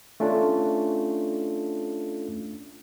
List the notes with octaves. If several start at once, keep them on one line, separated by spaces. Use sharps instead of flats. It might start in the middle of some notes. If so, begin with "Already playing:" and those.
A3 C#4 D4 F4 A4